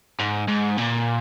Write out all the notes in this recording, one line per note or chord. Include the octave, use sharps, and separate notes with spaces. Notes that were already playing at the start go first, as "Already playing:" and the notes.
G#2
G#2
A#2